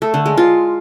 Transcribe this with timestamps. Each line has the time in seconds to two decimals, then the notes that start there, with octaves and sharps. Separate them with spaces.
0.02 A3
0.14 D3
0.26 G#3
0.38 F4